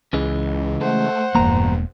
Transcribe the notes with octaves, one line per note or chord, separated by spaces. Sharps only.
C#2 C#3 E3 G#3
A3 C5 F#5
E1 E2 G2 A#3 A#5